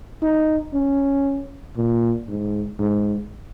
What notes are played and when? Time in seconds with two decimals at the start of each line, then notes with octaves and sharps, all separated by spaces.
0.22 D#4
0.74 C#4
1.77 A#2
2.28 G#2
2.79 G#2